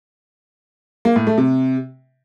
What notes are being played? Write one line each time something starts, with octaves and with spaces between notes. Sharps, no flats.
A#3
A2
A3
C3